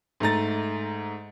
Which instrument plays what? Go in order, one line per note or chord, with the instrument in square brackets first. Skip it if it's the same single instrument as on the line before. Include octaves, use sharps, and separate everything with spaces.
[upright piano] G#2 A3 A#5 A6